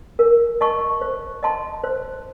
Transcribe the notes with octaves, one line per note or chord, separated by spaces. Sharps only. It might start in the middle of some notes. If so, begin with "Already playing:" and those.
A#4
D#5 A5 C#6
C5
D#5 A5 C6
C5